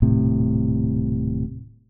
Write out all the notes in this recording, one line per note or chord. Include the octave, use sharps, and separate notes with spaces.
D#1 A2 C3